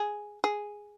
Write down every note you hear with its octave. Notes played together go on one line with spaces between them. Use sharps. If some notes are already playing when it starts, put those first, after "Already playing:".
Already playing: G#4
G#4